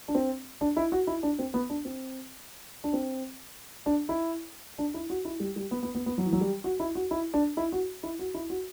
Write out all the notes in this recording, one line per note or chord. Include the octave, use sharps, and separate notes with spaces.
D4
C4
D4
E4
F#4
E4
D4
C4
B3
D4
C4
D4
C4
D4
E4
D4
E4
F#4
E4
G3
G3
B3
B3
B3
B3
F#3
E3
F#3
G3
F#4
E4
F#4
E4
D4
E4
F#4
E4
F#4
E4
F#4